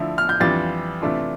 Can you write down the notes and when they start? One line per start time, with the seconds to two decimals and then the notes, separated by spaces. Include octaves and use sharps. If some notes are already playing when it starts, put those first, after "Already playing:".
Already playing: D3 F3 A3 E4
0.18 F6
0.29 G6
0.40 F2 E3 G3 D4 F4 A6
1.02 C3 E3 A3 D4 F4